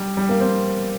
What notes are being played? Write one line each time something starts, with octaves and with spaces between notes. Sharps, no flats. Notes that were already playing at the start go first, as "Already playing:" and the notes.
Already playing: G3
G3
A#3
C4